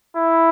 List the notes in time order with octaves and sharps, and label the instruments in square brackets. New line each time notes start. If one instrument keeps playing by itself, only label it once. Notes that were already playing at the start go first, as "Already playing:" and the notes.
[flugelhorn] E4